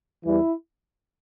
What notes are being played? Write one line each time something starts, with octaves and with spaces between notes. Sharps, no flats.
E2 E3 G3 E4